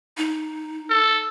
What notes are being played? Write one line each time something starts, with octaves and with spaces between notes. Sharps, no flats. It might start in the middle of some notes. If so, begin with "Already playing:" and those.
D#4
A4